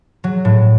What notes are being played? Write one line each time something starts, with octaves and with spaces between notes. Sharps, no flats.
F#3
A2